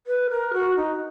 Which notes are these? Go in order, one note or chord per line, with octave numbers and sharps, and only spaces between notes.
B4
A#4
F#4
D#4